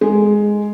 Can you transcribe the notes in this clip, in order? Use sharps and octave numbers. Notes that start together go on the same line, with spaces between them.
G#3